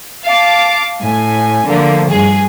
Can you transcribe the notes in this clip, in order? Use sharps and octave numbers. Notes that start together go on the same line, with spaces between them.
F5 A5 D6
A2 G#5
D3 F3 A3 A#3
G2 G#4